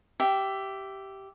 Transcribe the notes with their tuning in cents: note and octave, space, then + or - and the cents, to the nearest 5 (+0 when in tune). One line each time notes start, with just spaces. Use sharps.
G4 -10 E5 +10